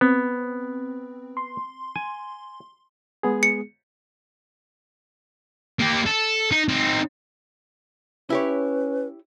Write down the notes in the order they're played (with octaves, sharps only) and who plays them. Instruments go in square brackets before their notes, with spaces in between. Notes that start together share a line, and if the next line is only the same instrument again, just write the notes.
[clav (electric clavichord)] B3 [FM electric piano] C4
[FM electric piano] C6
[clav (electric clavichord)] G#5
[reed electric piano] G#3 B3 G#4
[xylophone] C#7
[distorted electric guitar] A#3 G4
A4
D#4
C4 D#4
[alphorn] C#4 [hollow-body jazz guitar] E4 G4 C#5 [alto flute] B4